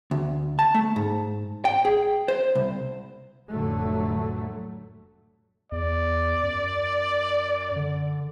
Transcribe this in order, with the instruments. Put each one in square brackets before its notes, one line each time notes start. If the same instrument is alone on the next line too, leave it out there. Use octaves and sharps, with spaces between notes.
[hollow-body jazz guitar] D2
A5
A3
G#2
G5
G#4
C5
C2
[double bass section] F1 A2 D3 F#3 A3
[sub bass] E2 [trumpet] D5
[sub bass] F#2
D3